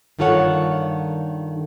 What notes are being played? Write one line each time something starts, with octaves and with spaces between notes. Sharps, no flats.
G2 D#3 F4 A4 C#5 F#5